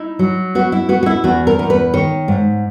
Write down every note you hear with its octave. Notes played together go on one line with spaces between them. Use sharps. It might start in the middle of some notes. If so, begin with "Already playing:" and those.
Already playing: D#4 E4
F#3
B3 F#4
E4
B3 F#4
F#4
E4
E2 F#4
A#4
E2
B4
D#3 C#5
G#2